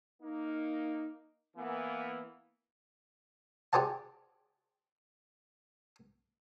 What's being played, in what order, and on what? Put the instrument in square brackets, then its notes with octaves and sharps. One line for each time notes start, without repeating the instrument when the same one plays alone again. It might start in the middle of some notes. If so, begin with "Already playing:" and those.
[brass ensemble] A#3 D#4
E3 A#3 B3
[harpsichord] G4 G#4 C5 D5 F#5 A5